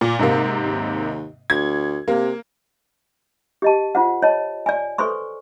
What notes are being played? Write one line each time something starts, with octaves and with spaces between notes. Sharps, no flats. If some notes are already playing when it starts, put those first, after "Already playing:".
A#2
G#2 C3 A#3
D#2
D2 G#6
C3 A#3
G4 D#5 A5
F4 C5 F#5
C#5 D#5 A5
D5 G#5
A4 B4 C5 C6 C#6